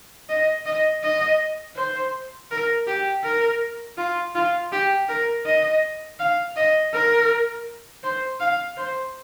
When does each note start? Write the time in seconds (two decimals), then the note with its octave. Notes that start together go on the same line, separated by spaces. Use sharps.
0.29 D#5
0.66 D#5
1.03 D#5
1.77 C5
2.51 A#4
2.87 G4
3.24 A#4
3.98 F4
4.35 F4
4.72 G4
5.09 A#4
5.46 D#5
6.19 F5
6.56 D#5
6.93 A#4
8.03 C5
8.41 F5
8.77 C5